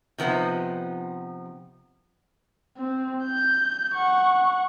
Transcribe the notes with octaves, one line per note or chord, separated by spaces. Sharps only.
C3 F3 B3 D#4
C4
G6
F#5 C#6